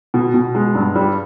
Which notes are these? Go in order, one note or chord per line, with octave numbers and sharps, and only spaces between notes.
B2
B2
G#3
G2
G3